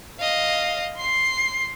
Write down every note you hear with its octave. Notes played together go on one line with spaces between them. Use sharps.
D#5 F5
C6 C7